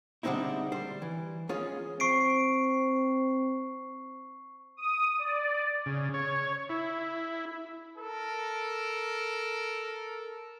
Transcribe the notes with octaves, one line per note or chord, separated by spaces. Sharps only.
D3 G3 G#3 C4 D#4 E4
G3 C5
E3
G#3 C#4 F4 G#4
C4 C#6 C7 D7
D#6
D5
C#3
C#5
E4
A4 A#4